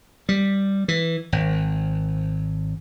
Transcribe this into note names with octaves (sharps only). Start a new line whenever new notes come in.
G3
E3
G#1